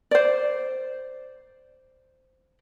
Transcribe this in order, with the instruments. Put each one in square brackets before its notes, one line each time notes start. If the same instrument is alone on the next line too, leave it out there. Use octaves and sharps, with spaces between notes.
[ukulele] C5 D5